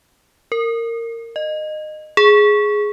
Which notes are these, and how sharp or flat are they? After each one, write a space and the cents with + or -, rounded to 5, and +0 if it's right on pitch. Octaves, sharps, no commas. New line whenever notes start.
A#4 -20
D#5 -20
G#4 +5